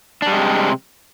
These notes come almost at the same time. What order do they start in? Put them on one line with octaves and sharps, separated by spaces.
D4 G3 G#3 C3